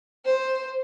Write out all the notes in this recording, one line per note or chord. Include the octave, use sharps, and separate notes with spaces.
C5